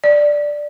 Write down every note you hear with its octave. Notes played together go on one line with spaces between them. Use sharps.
D5